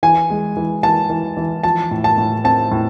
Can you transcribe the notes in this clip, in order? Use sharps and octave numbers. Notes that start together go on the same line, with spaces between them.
E3 G#5
G#3
E3
E3 A5
E3
E3
F3 A5
A2
A5
A2
C4 A5
A2